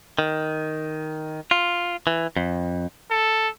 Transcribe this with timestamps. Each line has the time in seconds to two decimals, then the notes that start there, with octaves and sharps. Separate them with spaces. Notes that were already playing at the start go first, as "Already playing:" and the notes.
0.19 D#3
1.51 F4
2.07 E3
2.37 F2
3.10 A4